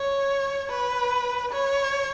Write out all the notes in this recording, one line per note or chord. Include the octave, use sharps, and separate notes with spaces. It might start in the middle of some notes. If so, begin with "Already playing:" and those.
Already playing: C#5
B4
C#5